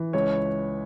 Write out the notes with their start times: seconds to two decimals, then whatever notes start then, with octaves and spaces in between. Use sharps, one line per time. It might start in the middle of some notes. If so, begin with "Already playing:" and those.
Already playing: E3
0.13 C#2 C#5